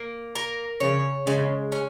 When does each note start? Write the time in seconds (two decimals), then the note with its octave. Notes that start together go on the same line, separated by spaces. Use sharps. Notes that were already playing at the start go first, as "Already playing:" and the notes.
Already playing: A#3
0.35 A#4
0.80 C#3 C#5
1.26 C#3 G#3
1.72 C#4